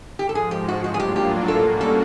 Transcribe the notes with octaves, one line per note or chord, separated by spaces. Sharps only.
G#2 F3 G#3 G4
A4
G#4
G4
F#4
A2 F#3 A#3 D4 F4 F#4
G#4
G4
G4
B2 G3 A#3 C#4 F#4 A4
A4